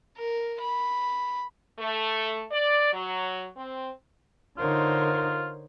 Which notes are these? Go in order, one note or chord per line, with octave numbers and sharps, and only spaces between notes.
A#4
B5
A3
D5
F#3
C4
D3 D#4 F4 A#4 C5 C#5